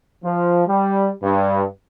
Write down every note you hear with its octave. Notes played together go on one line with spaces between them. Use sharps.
F3
G3
G2